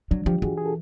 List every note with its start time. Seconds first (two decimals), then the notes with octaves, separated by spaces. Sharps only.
0.11 F#3 D4
0.26 F3 F4 G4
0.42 E3 F#4 G#4
0.57 G#4
0.66 A4